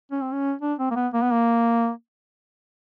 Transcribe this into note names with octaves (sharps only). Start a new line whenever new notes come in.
C#4
C4
C#4
D4
C4
A#3
B3
A#3
B3
A#3